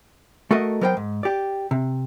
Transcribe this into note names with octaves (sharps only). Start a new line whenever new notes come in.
A3 F#4 A4 A#4 D#5
F#3 B3 A#4 C5 D#5 G5
G#2
G4 D5
C3